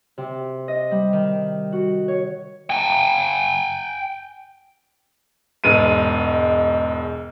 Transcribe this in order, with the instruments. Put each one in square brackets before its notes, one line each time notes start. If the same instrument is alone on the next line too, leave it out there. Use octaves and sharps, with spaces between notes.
[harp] C3
D#5
G3
D#3
F#4
C#5
[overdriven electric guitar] G5 G#5
[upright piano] E1 G#2 D#7